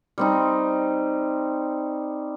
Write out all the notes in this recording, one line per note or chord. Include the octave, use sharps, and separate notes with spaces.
G3 C4 D#4